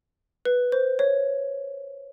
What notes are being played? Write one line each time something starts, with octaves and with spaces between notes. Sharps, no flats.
B4
C5
C#5